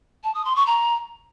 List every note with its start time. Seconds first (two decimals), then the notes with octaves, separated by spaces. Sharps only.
0.24 A5
0.35 D#6
0.45 C6
0.56 C#6
0.67 A#5